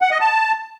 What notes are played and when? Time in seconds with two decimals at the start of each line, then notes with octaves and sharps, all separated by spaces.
0.02 F#5
0.11 D#5
0.20 A5